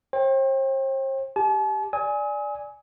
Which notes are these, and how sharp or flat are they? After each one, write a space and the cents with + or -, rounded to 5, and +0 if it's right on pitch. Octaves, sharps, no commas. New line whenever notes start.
C5 +45 G5 +10
G4 +0 A5 -45
D5 +0 G#5 +0 D#6 +45